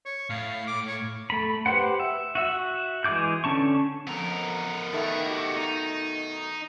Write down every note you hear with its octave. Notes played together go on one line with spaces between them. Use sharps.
C#5
A2 F5
D6
C#5
A3 B5
G4 B4 C5 F#5
E5
F#4 E5 E6
E3 G#3 G#4 D6 G6
D3 C#4 A5 C#6
F2 B3 A#4
B2 D#3 A3
F#4 G4
D#4